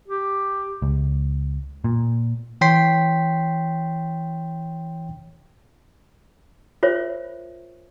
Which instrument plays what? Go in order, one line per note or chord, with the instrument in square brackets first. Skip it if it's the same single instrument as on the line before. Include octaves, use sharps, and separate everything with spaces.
[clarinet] G4
[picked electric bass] C#2
A#2
[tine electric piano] E3 C#5 G5 C6 B6 C7
[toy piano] F4 A#4 C5 C#5 E5